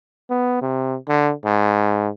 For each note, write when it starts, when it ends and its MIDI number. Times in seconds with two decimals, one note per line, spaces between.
0.30 0.58 59
0.62 0.96 48
1.09 1.32 50
1.45 2.09 44